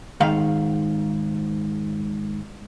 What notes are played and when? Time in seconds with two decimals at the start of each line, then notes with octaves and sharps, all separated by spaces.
0.20 G#2 D#3 F5